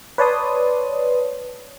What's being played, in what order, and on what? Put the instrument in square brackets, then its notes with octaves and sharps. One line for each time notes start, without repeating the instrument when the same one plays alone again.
[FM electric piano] B4 C#5 D5 A5 C6 D#6